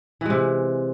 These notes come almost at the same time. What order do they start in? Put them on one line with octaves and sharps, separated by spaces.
E3 G#3 C3